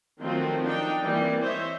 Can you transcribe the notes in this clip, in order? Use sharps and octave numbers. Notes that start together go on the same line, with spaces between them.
D#3 F3 F#3 A3 C4 F4
D4 D#4 G5
E3 G3 A#3 C4
C5 C#5 D#5 E5